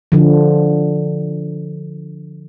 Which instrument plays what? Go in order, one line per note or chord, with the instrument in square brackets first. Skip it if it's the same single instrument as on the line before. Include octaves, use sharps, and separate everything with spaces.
[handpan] D3 F3